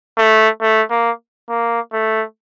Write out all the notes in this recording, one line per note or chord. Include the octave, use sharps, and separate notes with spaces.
A3
A3
A#3
A#3
A3